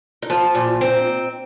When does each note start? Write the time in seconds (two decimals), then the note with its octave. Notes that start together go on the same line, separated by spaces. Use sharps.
0.22 D#4
0.30 F3 F4
0.55 A#2
0.81 C4 D#4